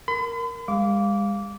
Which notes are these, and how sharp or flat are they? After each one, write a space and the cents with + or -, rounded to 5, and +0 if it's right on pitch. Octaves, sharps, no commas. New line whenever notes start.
A#4 +0 B5 +45
G#3 -40 F5 +0 D6 -20